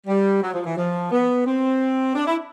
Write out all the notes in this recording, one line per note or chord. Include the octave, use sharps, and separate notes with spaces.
G3
F#3
F3
E3
F3
B3
C4
D4
E4